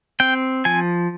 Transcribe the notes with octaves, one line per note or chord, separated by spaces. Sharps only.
C4 G5
F3 G#5